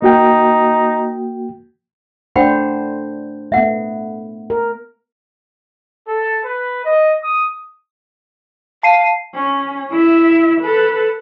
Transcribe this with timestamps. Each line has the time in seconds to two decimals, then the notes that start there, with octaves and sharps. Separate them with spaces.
0.02 A#3 D#4 F#4 G5
2.36 A3 D4 C5 F#5 G5 B5
3.52 A3 B3 E5 F#5
4.50 A#4
6.07 A4
6.44 B4
6.84 D#5
7.21 D#6
8.83 F5 A5 C7 D#7
9.34 C#4
9.91 E4 E5
10.61 A4 B4